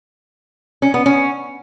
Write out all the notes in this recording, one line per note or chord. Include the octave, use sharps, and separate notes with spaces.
C#4
B3
C#4